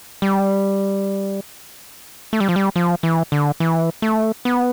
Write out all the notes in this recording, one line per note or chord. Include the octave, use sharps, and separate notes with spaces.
G3
A3
G3
F3
G3
F3
E3
D3
E3
A3
B3